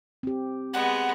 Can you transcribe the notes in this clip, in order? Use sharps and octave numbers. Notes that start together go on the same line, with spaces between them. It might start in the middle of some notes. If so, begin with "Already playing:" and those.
C4 G4
G#3 B3 F#5